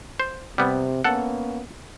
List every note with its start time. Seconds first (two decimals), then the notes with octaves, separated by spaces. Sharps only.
0.20 C5
0.58 C3 G3 B3
1.04 A#3 B3 C#4 A4 F#5